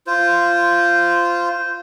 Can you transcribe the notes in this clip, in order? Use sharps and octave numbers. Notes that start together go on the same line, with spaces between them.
F4 C5